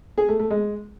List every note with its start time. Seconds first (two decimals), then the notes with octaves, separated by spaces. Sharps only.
0.18 G#4
0.29 A3
0.40 A3
0.51 G#3